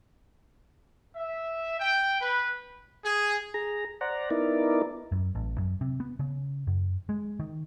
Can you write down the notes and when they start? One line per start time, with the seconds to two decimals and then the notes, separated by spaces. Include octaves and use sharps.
1.16 E5
1.80 G5
2.21 B4
3.04 G#4
3.54 G#4 A#5
4.01 C5 D5 F#5 A#5
4.30 B3 D#4 E4 A#4 D5
5.12 F#2
5.35 A1
5.58 F#2
5.81 C3
6.00 B3
6.19 C#3
6.67 F#2
7.09 G#3
7.40 D#3